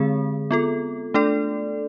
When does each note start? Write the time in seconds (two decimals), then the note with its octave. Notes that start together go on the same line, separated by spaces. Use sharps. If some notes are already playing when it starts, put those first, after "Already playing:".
Already playing: D3 G#3 C4 G#4
0.51 B3 F4 A4
1.14 A3 D4 A4 D5